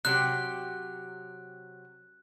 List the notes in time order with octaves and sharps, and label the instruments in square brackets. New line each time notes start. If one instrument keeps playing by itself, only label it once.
[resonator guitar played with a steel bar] C3 F#3 G4 [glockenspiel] F#6